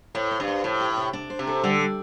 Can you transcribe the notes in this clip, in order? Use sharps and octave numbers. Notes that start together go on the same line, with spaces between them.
A2 C5
C5
G2
C5
A2 F3
G4
C3
D4
C5
C3
A4
D3 G3
G3